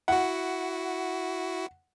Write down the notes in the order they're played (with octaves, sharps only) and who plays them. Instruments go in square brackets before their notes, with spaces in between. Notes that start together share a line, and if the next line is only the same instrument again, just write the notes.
[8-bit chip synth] E4 F#4 [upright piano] F#5